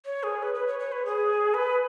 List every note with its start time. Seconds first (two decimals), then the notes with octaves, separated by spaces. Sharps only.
0.05 C#5
0.23 G#4
0.43 B4
0.54 B4
0.67 C#5
0.79 C#5
0.92 B4
1.05 G#4
1.54 B4